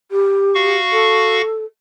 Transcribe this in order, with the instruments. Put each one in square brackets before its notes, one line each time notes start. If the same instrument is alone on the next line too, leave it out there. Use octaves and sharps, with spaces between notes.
[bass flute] G4
[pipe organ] F#4 F5 C#6
[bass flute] A4